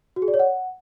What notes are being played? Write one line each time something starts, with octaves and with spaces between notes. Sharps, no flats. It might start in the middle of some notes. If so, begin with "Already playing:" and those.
F#4
G#4
D5
C#5
F#5